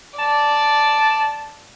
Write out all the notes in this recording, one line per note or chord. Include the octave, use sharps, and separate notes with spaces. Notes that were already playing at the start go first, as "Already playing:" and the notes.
D5 A5